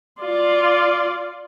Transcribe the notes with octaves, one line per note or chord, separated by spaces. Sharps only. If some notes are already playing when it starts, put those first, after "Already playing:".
F4 D5